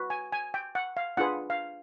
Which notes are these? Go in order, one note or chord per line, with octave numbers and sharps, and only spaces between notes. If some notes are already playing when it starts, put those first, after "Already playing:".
Already playing: F#4 B4
G#5
G#5
G5
F#5
F5
D4 F4 G#4 B4 F#5
F5